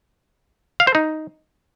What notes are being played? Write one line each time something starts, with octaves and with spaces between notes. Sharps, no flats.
F5
C5
D#4